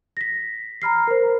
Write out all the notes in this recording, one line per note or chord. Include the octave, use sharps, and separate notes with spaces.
A#6 B6
A#5 B5 F6 C7
A#4 C5